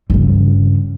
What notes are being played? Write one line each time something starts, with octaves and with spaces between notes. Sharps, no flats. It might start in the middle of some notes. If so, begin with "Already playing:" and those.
G2 C#3